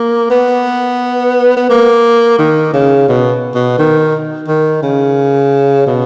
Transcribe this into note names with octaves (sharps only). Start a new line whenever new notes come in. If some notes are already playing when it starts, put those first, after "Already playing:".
Already playing: A#3
B3
B3
A#3
D#3
C#3
B2
B2
D#3
D#3
C#3
B2